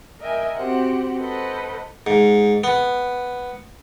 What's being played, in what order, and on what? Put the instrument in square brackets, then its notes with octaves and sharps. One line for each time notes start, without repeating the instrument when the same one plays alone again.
[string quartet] A#4 D#5 E5 G5 G#5
C4 F#4 G4 C5 F#5
A4 B4 C5 D#5 F#5
[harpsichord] G#2
B3